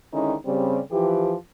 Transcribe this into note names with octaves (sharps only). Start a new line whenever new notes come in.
D3 D#3 G#3 C#4 D#4 E4
C#3 G3 C4
E3 F3 G4